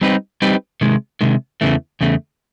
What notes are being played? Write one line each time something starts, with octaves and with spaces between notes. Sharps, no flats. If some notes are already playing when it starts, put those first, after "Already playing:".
G3 C4 D#4 G4 B4
G3 C4 D#4 G4 B4
C3 D#3 G#3
C3 D#3 G#3
E2 C#3 E3 A3
E2 C#3 A3